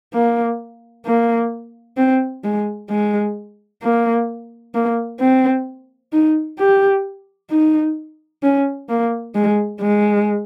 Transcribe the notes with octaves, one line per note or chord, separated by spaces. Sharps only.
A#3
A#3
C4
G#3
G#3
A#3
A#3
C4
D#4
G4
D#4
C#4
A#3
G#3
G#3